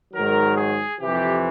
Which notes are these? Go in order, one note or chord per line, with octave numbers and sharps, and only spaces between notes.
G#2 D#3 F#3 A#4
G#4
F2 C3 E3 G4